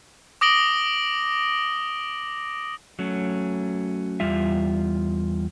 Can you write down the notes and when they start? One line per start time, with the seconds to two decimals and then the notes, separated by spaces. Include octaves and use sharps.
0.41 D6 D#6 A#6 D7 F#7 G7
2.99 F#3 A3 C#4
4.20 E2 G3 F4 E5